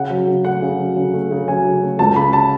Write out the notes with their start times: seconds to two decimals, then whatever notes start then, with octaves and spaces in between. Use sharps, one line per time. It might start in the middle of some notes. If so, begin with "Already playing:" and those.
Already playing: C#3 F#5
0.10 F#3
0.28 C#3
0.44 A3 F#5
0.62 C#3
0.79 F#3
0.97 C#3
1.13 A3
1.31 C#3
1.48 F#3 G#5
1.65 C#3
1.82 A3
1.99 C#2 A5
2.16 C#3 B5
2.33 A5